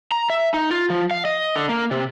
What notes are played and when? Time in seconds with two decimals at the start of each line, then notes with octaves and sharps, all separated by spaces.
0.12 A#5
0.30 E5
0.54 D#4
0.71 F4
0.90 F3
1.11 F5
1.25 D#5
1.56 D3
1.69 A#3
1.91 C3